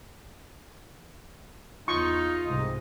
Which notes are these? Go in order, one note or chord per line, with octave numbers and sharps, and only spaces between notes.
E2 D#4 F4 C#6
C2 G#2 C3 D#5